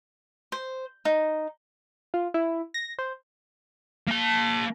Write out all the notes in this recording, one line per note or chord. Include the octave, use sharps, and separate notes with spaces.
C5
D#4
F4
E4
A#6
C5
A#3 A5